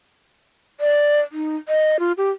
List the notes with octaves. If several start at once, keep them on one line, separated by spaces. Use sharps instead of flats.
D5
D#4
D#5
F4
G4